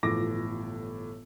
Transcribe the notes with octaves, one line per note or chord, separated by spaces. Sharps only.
G1 A2 E3 F3 D6 A#6